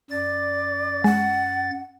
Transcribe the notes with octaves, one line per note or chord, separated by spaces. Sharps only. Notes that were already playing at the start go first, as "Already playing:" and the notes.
F#2 D5 A6
G#3 F#5